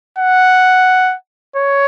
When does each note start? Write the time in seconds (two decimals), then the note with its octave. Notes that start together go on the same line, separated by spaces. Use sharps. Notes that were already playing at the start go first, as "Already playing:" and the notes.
0.18 F#5
1.56 C#5